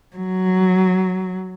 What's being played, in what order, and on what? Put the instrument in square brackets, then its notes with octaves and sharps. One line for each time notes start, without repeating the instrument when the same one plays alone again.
[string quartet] F#3